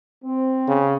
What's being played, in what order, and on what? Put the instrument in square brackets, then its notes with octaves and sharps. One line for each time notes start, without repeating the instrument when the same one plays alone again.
[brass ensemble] C4
[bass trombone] C#3